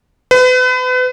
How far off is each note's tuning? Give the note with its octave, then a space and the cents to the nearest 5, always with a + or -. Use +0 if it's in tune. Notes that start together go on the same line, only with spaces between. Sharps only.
B4 +35